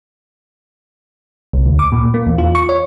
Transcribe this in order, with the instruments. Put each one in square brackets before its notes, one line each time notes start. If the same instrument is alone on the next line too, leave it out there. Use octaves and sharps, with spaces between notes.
[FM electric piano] C2
D2
D6
A#2
A#3
E2
F4
C#6
C#5